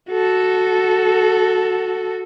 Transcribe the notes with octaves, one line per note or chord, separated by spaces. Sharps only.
F#4 A4